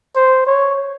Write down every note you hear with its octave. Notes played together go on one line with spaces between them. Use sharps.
C5
C#5